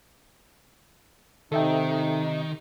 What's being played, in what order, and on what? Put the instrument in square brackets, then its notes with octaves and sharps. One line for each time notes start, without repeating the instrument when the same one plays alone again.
[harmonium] C3 D#4 [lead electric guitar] D#3 [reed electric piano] A4 E5 G5